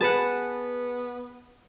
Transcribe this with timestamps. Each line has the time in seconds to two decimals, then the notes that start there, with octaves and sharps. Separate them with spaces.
0.01 B3 G#4 B4 F#5 A5